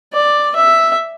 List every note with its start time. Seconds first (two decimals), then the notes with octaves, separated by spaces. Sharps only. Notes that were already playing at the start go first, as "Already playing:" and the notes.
0.13 D5
0.56 E5